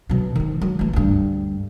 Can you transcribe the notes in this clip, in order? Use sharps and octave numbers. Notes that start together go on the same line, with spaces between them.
B2 F#3
D#3 C4
F#3
E3 A3
D2 G2